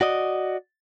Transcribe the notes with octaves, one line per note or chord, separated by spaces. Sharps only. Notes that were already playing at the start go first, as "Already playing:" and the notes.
F#4 D5 D#5